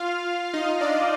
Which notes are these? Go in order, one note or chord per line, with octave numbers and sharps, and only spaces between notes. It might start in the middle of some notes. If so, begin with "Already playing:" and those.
Already playing: F4 F5
D#4 D#5
D4 D5